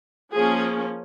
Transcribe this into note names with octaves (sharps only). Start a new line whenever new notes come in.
F3 A#3 C#4 G#4